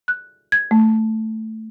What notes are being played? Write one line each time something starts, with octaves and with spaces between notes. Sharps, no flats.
F#6
G#6
A3